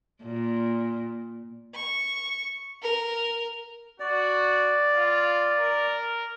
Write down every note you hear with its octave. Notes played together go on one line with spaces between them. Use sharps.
A#2
C#6
A#4
F#4 D5
F4
A#4